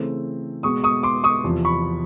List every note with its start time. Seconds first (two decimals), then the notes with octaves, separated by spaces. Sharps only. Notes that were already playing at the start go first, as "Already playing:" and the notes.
Already playing: C#3 E3 A3 C4
0.63 B2 G#3 B3 C#6 D#6
0.84 C#6 D#6
1.03 C6 D6
1.24 C#6 D#6
1.44 E2 C3 F3
1.65 B5 C#6